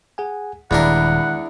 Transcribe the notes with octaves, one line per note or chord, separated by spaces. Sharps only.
G#4 F#5 G#5
D#1 E2 D#3 G#3 D4 A#4 F#5 B5